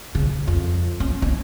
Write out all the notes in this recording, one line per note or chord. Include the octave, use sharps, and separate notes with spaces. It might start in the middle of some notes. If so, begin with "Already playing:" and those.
C#3
F2
C#4
C#4